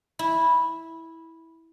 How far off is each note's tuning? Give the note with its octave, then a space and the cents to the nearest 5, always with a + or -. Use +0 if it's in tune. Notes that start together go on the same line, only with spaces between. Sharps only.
E4 -10